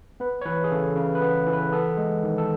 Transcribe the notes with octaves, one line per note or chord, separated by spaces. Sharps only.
B3 B4
C#5
E3 B4
G#4
C#3 A4
C#3
B4
B3
E3
B4
B3 A4
G#3
D#3
A4